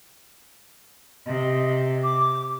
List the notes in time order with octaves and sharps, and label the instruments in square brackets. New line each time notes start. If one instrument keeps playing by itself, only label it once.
[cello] C3 [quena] D#5
[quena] D6